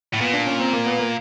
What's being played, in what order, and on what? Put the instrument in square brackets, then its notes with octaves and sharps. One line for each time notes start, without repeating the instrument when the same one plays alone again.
[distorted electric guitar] A2
[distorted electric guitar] A#2 [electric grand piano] B3
[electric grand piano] D4
C#4
C4
A#3
B3
A#3